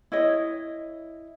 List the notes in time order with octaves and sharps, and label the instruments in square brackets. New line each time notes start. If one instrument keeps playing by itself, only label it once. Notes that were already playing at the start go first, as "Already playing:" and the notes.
[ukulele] E4 C#5 D#5